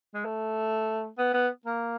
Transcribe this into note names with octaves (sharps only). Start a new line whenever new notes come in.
G#3
A3
B3
B3
A#3